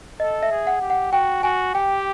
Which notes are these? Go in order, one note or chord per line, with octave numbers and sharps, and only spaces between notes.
A4 D#5
E5
G#4
F#5
G4
F#5
F#4 G5
F#4 G#5
G4 G5